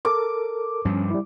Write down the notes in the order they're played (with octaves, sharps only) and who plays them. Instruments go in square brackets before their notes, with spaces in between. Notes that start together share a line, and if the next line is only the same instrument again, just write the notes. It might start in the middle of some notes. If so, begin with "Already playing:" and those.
[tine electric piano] A4 A#4 [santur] D6
[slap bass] G2 F3 [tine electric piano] C#4
[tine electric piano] G3 E4